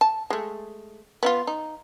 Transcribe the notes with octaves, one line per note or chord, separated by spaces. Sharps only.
A5
G#3 A3
B3 E4 F4
D#4